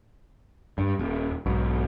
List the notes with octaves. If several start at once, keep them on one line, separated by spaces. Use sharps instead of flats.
G2
D#1
B1 G#2